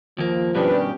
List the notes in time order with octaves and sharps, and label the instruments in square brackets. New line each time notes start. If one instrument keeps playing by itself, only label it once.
[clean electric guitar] D#2 A#3 [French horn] F3
[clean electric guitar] G2 B2 D#3 [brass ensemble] C#4 G4 [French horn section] D4 B4